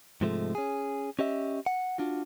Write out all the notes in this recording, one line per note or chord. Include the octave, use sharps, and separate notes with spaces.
G#2 C3 F3 G#3 A3
C#4 G#4
C#4 G4 D#5 E5
F#5
D4 F4 F#4